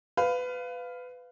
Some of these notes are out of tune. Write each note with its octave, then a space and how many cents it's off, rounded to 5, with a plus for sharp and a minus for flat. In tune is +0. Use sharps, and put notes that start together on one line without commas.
B4 +20 F5 +0